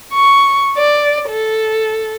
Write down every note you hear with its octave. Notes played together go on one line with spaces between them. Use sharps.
C#6
D5
A4